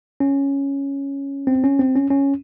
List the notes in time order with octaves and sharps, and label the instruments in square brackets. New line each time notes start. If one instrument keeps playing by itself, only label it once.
[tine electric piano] C#4
C4
C#4
C4
C#4
C#4